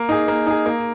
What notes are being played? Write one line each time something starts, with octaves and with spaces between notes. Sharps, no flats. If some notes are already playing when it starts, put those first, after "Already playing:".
Already playing: A#3
D#4 G#4
A#3
D#4 G#4
A#3